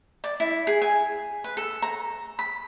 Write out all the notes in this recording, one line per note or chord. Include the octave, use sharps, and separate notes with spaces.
D5
E4
G#4
G#5
B4
A4
A#5
B5